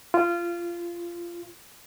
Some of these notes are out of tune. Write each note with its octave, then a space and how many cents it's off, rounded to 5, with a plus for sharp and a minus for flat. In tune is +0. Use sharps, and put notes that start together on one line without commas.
F4 -20